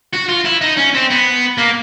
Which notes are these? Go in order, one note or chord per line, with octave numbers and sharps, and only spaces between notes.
F#4
F4
E4
D#4
C#4
C4
B3
A#3